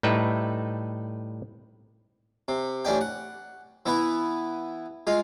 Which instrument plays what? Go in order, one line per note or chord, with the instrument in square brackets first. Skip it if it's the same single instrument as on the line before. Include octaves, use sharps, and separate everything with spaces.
[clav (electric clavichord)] A2 G3 D#4 B4 E5
[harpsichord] C3
A1 C#4 D4 G5
F#5
E3 B3 E4 B4
G#3 F4